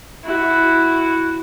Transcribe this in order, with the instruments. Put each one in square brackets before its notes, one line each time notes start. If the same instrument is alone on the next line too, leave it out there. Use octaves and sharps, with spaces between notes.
[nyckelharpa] E4 F#4